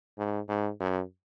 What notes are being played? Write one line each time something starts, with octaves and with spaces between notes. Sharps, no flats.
G#2
G#2
F#2